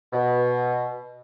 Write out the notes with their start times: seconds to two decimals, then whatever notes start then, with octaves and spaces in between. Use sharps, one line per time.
0.13 B2